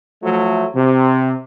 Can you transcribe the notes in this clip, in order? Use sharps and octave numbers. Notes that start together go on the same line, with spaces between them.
F3 F#3 A3
C3